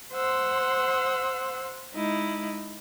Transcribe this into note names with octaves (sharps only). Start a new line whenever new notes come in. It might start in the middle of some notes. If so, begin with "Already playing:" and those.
C5 F#5 C6 E6
G#3 D#4 E4